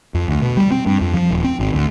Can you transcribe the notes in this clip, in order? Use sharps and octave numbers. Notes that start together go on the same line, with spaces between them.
F2
D2
B2
G3
C4
G2
F2
F3
D#1
C4
G#1
D2